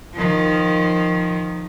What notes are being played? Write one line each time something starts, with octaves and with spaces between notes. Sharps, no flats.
D#3 F3